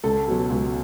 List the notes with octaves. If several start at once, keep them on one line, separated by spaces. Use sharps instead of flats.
C#2 A4
B2 F#3
C#2